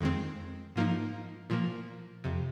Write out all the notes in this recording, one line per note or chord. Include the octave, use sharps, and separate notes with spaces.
F2 D#3 G#3 C4
G#2 F3 A#3 D#4
A#2 F3 A#3
F2 C3